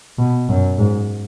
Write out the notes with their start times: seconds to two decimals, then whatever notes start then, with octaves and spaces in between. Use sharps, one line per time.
0.19 B2
0.49 F#2
0.78 G#2